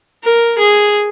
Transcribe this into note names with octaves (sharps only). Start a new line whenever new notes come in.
A#4
G#4